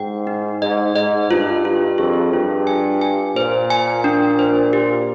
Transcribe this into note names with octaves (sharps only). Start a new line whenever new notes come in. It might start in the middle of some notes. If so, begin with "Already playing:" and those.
Already playing: G#2 G5
D#4
G#2 D#5
G#2 D#5
G2 F4
F4
F2 G#4
G2 F4
G#5
G#5
A#2 C5
G#5
D4
C5
G4